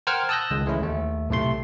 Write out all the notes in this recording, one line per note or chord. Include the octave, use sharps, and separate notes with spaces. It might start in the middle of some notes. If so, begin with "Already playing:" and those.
A#4 C5 F#5 G5 F6 G#6
A5 D#6 E6 F#6 G6 A#6
C#2 D#3 G#3
E3 G#3 A3 C#4 E4
D#2 A3
B1 A2 C3 A3 C6